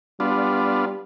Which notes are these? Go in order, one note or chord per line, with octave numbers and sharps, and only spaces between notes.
G3 B3 D4 F4